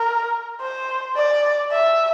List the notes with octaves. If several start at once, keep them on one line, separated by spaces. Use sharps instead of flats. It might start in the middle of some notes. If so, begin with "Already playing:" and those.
Already playing: A#4
C5
D5
E5